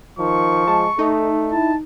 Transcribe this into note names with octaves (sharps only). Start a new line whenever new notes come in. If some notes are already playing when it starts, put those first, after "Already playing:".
D#3 F3 C#6
G#3 A5
A3 D#4 A4
E4 A5